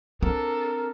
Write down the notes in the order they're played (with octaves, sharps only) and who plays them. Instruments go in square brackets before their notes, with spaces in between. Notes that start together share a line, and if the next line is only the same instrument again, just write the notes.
[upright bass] C4 [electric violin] D4 A4 [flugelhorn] A#4